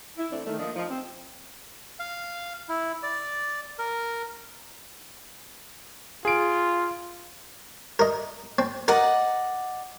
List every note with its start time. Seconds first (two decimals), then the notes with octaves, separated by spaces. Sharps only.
0.17 E4
0.31 E3 A3 C4 D4
0.46 D#3 A3
0.58 F3 A#3 D4 D#5
0.75 F3 D#4
0.90 C4
1.99 F5
2.69 E4
3.03 D5
3.79 A#4
6.25 F4 G#4 D7
7.99 A#4 D#5
8.59 C4
8.88 A#4 D5 D#5 F#5